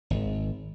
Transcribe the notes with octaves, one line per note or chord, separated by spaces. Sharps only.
G#1